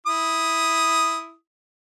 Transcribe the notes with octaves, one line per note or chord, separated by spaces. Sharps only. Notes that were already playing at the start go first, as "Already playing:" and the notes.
E4 D#6